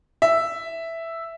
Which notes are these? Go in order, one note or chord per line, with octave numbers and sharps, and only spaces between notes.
E5